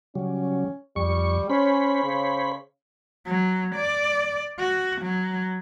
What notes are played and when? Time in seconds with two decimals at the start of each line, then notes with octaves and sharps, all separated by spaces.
0.15 C#3 F#3 G3 C#4
0.96 F2 G3 C#6
1.50 C#4 C5 C#5 B5
2.04 C#3
3.26 F#3
3.76 D5
4.58 F#4
5.02 F#3